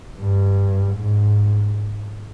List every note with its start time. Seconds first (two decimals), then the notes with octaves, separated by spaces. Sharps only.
0.19 G2
0.95 G#2